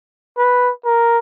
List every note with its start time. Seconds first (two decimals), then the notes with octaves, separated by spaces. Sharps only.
0.38 B4
0.85 A#4